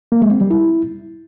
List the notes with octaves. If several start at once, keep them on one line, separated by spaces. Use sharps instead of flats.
A#3
G#3
C4
G3
E4